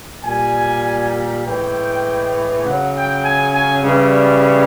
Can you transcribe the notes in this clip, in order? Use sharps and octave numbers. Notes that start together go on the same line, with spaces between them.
A#2 G3 G#5
A2 E3 G#3 G5
C#3 F#3 F#5
G5
G#5
G#5
C#3 E3 G3